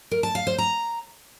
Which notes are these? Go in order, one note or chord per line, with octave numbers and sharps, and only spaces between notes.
A#4
A5
F5
C5
A#5